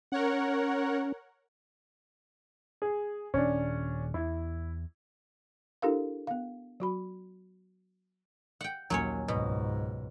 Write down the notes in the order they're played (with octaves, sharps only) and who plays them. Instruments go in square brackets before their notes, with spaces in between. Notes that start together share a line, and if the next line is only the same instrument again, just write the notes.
[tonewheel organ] C#4 [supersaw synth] A#4 C#5 F#5
[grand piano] G#4
[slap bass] D#1 [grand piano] C#4 D4
[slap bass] E2 [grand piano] E4
[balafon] D4 E4 G4 A4 A#4 F5
B3 F5
F#3 F#4 B5
[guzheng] F#5 G5
[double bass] A#1 D#2 [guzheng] F#3 C#4 C#5
[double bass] C#2 G#2 [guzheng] B2